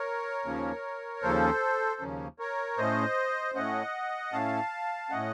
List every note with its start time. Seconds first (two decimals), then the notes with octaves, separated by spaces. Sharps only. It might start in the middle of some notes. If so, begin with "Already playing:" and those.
Already playing: A#4 C#5
0.45 D#2 C#3 F3 A#3 C#4
1.22 D#2 C#3 F3 A#3 C#4 A4 C5
2.01 D#2 C#3 F3 A#3 C#4
2.39 A#4 C#5
2.77 A2 A3 C#4 C5 D#5
3.55 A2 A3 C#4 D#5 F#5
4.33 A2 A3 C#4 F5 A5
5.10 A2 A3 C#4 D#5 F#5